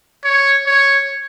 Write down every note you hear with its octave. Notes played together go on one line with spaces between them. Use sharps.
C#5
C#5